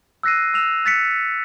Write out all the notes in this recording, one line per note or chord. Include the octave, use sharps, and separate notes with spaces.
E6 F#6 A#6 C7 D#7
E6 E7 F7
F#6 A6 B6 C#7